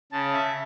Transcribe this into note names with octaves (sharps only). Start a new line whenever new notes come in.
C#3 A5
E5